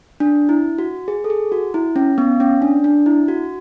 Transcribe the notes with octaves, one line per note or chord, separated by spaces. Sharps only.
D4
E4
F#4
G#4
A4
G#4
F#4
E4
C#4
B3
C#4
D4
D4
E4
F#4